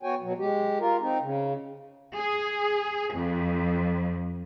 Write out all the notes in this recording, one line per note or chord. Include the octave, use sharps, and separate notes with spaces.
B3 F#4 C#5 G5 G#5
B2 F#3
G#3 G4
F4 A#4
C4 D#4
C#3
G#4
F2